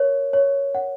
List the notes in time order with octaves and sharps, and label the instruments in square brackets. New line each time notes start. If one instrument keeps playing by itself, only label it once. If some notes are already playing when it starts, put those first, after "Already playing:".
Already playing: [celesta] A#4 C#5
C#5
F#5